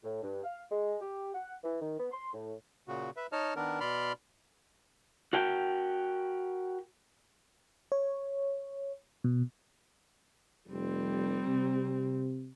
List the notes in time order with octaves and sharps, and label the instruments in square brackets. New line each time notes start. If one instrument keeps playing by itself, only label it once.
[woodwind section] A2
G2
F5
G#3
G4
F#5
E3
D#3
B3
C6
A2
[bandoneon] A#2 C#3 F#4
B4 E5
D#4 C#5 D#5 A5 F6
D#3 B3 D4 A#4
B2 D5 B5 C6 F6
[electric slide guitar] F#4 A#4 G5
[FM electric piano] C#5
B2
[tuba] F1 [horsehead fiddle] G3 C4
[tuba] C3